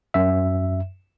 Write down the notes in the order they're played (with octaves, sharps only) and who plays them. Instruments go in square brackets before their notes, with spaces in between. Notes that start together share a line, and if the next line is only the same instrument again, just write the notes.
[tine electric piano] F#2 E5